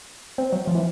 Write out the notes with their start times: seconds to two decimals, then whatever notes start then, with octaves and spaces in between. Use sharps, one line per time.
0.38 C4
0.53 F#3
0.67 F3
0.75 E3